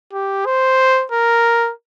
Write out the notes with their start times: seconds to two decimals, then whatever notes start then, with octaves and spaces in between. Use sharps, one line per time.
0.13 G4
0.46 C5
1.12 A#4